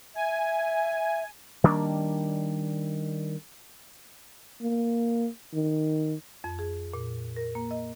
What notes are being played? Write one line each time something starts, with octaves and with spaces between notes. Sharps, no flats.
E5 G#5
D#3 G3 A#3 D4
A#3
D#3
F2
G#4
A#2
A#4
A#3
D#5